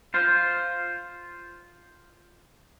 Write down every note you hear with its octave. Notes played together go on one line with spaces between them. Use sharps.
F4 C5